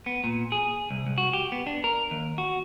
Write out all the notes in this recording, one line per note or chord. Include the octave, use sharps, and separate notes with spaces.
B3
A#2
G#4
C2
C2
F#4
G4
B3
D4
A#4
D#2
F#4